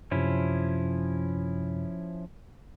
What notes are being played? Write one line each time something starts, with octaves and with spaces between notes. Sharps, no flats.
F#2 C3 F3 C#4 E4